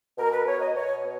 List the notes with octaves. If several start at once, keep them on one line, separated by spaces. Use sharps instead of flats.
B2 A#4
B4
B2 C#5
D#5
B2 C#5
B3